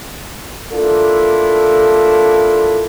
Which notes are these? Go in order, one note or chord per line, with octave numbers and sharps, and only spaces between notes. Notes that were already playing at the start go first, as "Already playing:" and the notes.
A#3 D4 E4 F4 A4